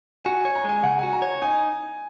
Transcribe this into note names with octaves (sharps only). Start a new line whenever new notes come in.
F#4 G#5
C#5 G#5
A#5
G#3 G#5
C#3 F#5
F#4 G#5
A#5
C#5
D#4 G#5